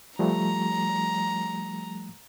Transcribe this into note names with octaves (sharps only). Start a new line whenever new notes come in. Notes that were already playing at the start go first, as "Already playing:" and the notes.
F3 G3 A3 A#5